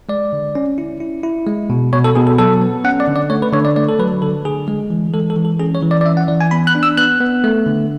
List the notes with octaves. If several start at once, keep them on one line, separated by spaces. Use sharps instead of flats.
G#3 D5
D3
C#4
E4
E4
E4
G#3
B2
B2 C#5
A4
B2 G#4
A4
F#3 A4
B3
C#4 F#5
D5
D3
D5
A3 C#5
B4
D3 C#5
D5
A3 D5
A4
F#3 B4
D3 A4
D3 G#4
G#3
E3
G#3 A4
A4
E3
A4
C#4 G#4
C#5
E3
D5
D5
C#4 E5
F#5
E3 D5
G#5
B3 B5
F#6
D4
E6
B3 F#6
B3
A3
D3